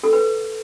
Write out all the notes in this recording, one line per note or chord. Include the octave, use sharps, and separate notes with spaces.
A4
B4